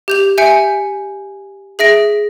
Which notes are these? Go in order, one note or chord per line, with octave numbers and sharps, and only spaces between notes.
G4 G6 F7
E5 G#5 G6 C#7 D7
G#4 E5 A#6 D7